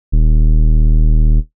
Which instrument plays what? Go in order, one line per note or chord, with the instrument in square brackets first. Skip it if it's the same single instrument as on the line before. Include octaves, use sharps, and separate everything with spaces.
[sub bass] D#1